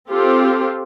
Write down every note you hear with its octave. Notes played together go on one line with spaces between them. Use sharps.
C4 F4 G4 A4